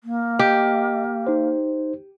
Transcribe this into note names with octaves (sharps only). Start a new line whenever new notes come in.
A#3
G4 D#5
D#4 C5